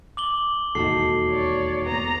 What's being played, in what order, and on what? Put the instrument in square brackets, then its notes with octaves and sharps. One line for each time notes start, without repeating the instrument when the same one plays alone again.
[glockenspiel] D6 F#7 G7
[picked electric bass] E1 D#2 [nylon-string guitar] D#4 F#4 A4 [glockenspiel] C7
[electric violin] C#5 D5
[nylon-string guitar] B3 [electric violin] A#5